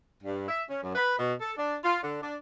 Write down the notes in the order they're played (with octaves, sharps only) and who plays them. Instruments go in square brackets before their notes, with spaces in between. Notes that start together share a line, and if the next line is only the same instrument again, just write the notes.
[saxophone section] G2
E5
C#4
F#2
B4
B2
A4
D4
F4
D3
D4